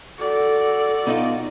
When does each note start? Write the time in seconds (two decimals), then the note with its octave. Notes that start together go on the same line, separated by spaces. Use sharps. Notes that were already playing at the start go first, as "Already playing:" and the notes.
0.19 F#4 A4 D5
1.07 B2 D#4 F4